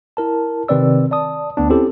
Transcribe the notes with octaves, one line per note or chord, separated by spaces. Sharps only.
E4 A#4 A5
C3 D#3 C4 B4 D5 E6
D5 A5 D#6
D2 B3 D4
C4 C#4 E4 G4 A4